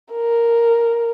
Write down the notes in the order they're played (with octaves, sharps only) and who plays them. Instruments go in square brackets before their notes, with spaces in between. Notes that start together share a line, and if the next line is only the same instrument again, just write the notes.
[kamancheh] A#4